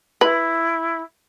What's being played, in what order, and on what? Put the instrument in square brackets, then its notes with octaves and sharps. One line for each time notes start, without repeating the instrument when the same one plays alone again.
[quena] E4 [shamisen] B4